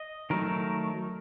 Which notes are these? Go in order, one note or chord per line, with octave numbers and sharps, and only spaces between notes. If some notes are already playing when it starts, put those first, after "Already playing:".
Already playing: D#5
D#3 F#3 A3 D#4 A#4